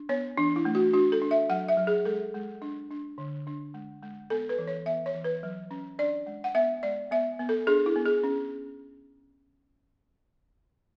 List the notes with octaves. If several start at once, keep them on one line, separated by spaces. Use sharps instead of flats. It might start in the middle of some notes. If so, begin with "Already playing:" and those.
Already playing: D4
B3 C#5
E3 D4
E4
A3
F#4
D4 F#4
A4
D4
E5
F#3 F#5
E5
F#3
G#4
G#3 A4
G#3
D4
D4
D3
D4
G#3
G#3
B3 A4
B4
E3
C#5
B3 E5
C#5
E3
B4
F#3
C#4
D4 D5
G#3
F#5
B3 E5
G#3 D5
B3 E5
B3
A4
D4 G#4
E4
B3
G#4
C#4